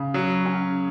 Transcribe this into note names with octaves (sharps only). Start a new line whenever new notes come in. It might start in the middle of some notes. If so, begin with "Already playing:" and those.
Already playing: C#3
F#3
C#4